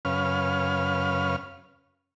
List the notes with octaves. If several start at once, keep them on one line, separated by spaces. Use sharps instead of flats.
F#2 C#3 C#4 B4 F5 F6